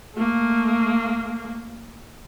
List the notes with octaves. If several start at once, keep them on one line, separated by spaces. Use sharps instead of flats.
A3 A#3